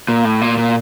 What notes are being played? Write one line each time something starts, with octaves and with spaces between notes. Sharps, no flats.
A#2
A2
A#2
A#2